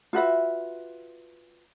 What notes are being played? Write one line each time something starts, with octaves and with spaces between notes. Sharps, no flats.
F4 F#4 B4 E5